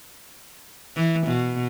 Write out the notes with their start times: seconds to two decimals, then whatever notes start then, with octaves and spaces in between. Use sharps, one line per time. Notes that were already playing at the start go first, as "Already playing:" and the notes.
0.96 E3
1.27 B2